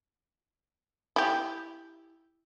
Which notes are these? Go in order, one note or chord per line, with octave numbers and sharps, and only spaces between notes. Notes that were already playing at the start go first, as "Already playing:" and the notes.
E4 G4